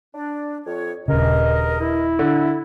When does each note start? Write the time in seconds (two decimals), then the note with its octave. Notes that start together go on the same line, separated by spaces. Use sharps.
0.14 D4
0.65 F2 C#5
1.08 D#1 G2 C#3 G#3 A#4 D#5
1.80 E4
2.19 D3